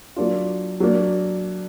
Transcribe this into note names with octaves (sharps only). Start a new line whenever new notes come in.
F#3 A#3 D4 F4
F#3 A#3 D4